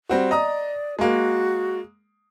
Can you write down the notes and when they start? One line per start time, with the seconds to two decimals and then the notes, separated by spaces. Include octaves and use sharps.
0.09 G3 C4 F#4
0.31 D5 D#5 A#5 D#6
0.99 G#3 A#3 F#4